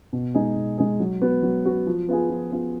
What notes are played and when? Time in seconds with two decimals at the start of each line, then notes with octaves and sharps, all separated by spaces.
0.13 B2
0.35 G#3 D#4 G#4
0.56 B2
0.78 G#3 D#4 G#4
1.00 F#3
1.22 B3 F#4
1.43 F#3
1.65 B3 F#4
1.87 F3
2.09 B3 F4 G#4
2.30 F3
2.51 B3 F4 G#4